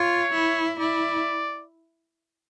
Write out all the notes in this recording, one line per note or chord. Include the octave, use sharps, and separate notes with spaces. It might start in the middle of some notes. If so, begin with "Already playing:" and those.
Already playing: F4 C#5
E4
E4 D5